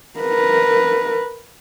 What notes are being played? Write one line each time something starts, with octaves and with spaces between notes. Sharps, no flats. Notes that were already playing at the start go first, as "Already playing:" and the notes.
A#4 B4